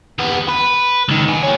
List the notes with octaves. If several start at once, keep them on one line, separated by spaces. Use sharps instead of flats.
D#2 B3
B4
C#2 D#3
B3 G#5
G4 C#5